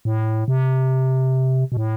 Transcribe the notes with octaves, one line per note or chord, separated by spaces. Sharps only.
A2
C3
B2
A2